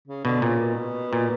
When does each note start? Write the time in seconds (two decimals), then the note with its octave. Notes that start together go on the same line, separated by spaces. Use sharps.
0.08 C#3
0.25 B2 D3
0.42 A#2 C#3
0.60 B2
1.13 A#2